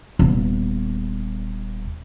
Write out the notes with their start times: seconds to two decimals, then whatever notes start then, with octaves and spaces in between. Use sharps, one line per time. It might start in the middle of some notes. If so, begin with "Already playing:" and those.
0.19 D#1 B3